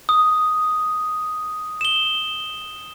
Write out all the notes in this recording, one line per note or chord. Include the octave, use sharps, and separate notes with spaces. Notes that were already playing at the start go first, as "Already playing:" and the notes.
D#6
E7 G7